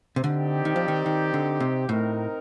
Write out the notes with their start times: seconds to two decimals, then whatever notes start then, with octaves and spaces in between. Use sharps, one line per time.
0.16 C3
0.23 D3 C4 D#4 G4 D5
0.65 D#3
0.76 F3
0.88 D#3
1.06 D#3
1.34 D3
1.60 C3
1.88 A2 C4 D#4 A#4